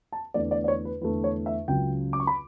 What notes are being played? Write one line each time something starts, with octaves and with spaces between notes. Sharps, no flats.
A5
E2 D3 A3 D5
D5
D5
C#5
B4
E2 D3 A3 B4
C#5
E5
C#2 C#3 F#3 C#4 G5
D6
C#6
B5